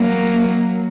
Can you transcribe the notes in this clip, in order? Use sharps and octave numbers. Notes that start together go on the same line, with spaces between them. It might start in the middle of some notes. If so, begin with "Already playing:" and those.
Already playing: F#3 A#3